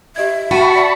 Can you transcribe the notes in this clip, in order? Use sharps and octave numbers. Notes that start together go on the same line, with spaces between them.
G4 D#5 E5 G#6
F#4 G5 A5 B5 C#6 D#7 E7
D5 E5